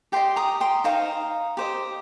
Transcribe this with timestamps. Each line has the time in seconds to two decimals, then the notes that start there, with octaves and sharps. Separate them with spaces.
0.12 G4 D#5 G5 C6
0.36 A#5 D#6
0.61 G5 C6
0.84 D#4 C5 D#5 F5 A#5
1.57 G4 C5 D#5